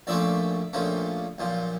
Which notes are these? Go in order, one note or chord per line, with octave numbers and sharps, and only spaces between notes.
A#1 A#2 F3 A3 C#4 D5 E5
A#1 A#2 F3 A3 C#4
B1 A#2 F3